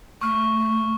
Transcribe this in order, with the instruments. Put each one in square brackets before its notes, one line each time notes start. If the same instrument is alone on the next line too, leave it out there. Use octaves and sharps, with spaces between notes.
[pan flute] A3 [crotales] C#6 F6